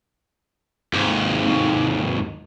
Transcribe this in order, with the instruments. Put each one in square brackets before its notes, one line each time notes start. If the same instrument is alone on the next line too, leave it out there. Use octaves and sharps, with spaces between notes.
[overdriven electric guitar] D#2 G#2